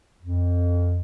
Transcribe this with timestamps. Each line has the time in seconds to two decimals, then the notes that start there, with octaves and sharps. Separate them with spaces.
0.21 F2